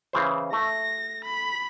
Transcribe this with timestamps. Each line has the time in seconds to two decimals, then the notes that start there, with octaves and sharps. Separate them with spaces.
0.13 C#3 E3 C5
0.53 A3 A#6
1.25 B5